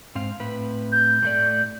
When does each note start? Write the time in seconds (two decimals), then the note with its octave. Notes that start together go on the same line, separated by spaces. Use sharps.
0.15 G#2 C4 F5
0.40 A2 C4 B4
0.92 G6
1.23 A2 A3 D5